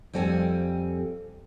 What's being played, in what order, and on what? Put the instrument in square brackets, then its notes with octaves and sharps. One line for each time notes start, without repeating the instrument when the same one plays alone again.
[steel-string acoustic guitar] F2 G3 C4 A4 G#5